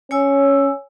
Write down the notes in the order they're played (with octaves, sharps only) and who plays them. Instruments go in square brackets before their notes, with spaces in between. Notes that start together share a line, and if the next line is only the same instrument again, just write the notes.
[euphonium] C#4 [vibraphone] C#5 G#5 E6